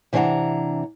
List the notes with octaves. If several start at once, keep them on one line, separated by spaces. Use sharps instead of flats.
C3 E3 D4 C#5 F#5 A#5